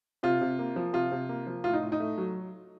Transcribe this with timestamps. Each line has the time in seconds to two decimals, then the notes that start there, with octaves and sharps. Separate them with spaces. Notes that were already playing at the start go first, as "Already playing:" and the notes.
0.23 C3 F4
0.41 C3
0.59 A#3
0.76 F3
0.93 C3 F4
1.12 C3
1.29 A#3
1.47 F3
1.64 A2 F4
1.73 D#4
1.82 A2
1.92 D#4
2.00 A3
2.18 F#3